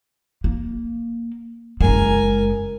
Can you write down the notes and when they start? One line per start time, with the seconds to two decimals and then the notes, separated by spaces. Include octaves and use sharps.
0.44 A#3
1.81 F#1 G#3 A#4 G#5